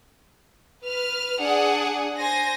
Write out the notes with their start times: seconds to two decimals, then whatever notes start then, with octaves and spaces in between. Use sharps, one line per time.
0.84 B4 F6
1.40 D4 G#4 F#5
2.17 C5 G#5 A#6